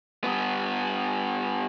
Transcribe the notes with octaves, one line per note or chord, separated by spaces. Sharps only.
G2 B3